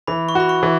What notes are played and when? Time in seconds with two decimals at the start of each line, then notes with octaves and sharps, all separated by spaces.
0.07 E3 B5
0.29 C#6
0.35 F#4 B5
0.49 C#6
0.63 E3